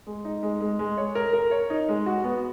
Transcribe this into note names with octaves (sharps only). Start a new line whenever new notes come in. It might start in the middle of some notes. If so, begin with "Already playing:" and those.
G#3
D#4
G#3
G#3
G#3
C#5
A#4
A#4
C#5
D#4
G#3
F#4
B3